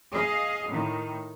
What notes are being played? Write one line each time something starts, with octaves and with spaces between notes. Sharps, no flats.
G#4 D#5 F5
A2 D#3